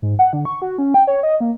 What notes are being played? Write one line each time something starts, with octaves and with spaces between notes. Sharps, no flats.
G#2
F#5
D3
C#6
F#4
C#4
G5
C#5
D#5
A#3